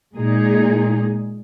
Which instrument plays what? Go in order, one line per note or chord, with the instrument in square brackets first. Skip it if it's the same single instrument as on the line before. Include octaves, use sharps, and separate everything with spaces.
[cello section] A#2 G#3 D#4 G#4